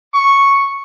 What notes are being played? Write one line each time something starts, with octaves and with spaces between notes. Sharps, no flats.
C#6